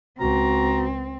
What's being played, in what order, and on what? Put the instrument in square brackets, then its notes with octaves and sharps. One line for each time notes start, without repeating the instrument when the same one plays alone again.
[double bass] C#2 [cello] C4 [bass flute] F#4 [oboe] A#5